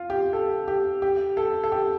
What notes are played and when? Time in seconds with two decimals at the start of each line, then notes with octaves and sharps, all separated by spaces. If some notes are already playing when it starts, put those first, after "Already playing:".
Already playing: F4
0.10 G4
0.33 A4
0.68 G4
1.02 G4
1.37 A4
1.64 A4
1.72 G4